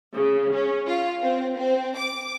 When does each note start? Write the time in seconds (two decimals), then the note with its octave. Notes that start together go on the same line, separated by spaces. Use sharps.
0.14 C#3
0.53 C#4
0.86 F4
1.21 C4
1.56 C4
1.96 D6